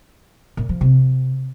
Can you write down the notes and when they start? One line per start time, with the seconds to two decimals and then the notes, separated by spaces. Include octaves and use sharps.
0.57 A#2
0.69 F3
0.81 C3